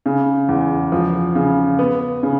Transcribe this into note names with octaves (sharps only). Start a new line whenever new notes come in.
C#3
E2
F3
C#3
B3
C#3